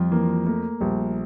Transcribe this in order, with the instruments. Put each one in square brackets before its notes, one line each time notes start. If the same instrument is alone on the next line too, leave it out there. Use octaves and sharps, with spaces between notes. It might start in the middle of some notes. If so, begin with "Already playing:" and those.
Already playing: [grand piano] F2 F4 [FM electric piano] F3 G3
[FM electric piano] E3 [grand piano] A#3
[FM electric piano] A3 [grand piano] A#3
[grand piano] A#1 [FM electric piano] G3